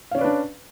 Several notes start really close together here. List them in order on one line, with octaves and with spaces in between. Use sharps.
F5 C#4 D5 B4 D4